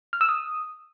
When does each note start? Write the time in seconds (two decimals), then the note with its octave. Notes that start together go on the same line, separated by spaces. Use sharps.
0.13 F6
0.21 E6
0.29 D#6